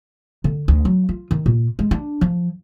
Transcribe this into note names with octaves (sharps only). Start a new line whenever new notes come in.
D3
D2
F#3
F4
D#3
A#2
G#3
D4
F3